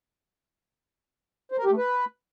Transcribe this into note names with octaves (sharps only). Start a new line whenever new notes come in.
C5
A#4
G4
A3
B4